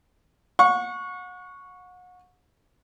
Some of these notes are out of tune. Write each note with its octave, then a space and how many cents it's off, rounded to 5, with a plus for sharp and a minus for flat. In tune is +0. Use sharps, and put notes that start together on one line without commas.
F#5 -35 C#6 +0